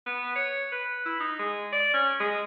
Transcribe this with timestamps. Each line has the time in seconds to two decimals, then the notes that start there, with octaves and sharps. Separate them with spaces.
0.06 B3
0.36 C#5
0.72 B4
1.06 E4
1.20 D#4
1.39 G#3
1.72 D5
1.94 C#4
2.20 G#3